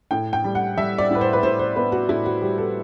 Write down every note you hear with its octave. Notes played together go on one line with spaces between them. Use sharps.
A2 G5
G5
G3
F#5
G3 E5
D5
A2 B4
C5
B4
A2 C5
C5
B3 B4
F#4
A2 E4
F#4
G3 G4
A4